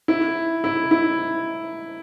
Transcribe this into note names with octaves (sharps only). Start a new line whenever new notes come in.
E4
E4
E4